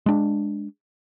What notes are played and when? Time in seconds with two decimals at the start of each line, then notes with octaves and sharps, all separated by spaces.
0.06 G#3 D4